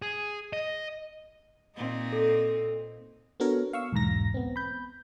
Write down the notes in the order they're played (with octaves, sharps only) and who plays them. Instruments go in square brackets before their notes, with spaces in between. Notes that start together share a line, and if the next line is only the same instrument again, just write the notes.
[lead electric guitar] G#4
D#5
[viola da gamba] A#2 C4 D#4
[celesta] A4
[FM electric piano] B3 D4 F#4 A4 A#4 C#5
F5 C#6 E6
B1 E2 G#2 A#5 A#6
B3 C4
B5 G6